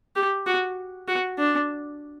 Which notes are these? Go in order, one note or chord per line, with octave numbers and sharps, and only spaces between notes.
G4
F#4
F#4
D4